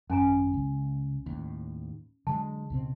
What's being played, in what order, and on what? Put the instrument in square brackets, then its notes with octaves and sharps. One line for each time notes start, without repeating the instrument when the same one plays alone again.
[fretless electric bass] G#1 F#2 [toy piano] C#4 G#5 A#5
[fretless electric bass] C#2
D#2 A2
[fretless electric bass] D3 F#3 G#3 [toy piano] A5
[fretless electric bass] C#2 B2 C4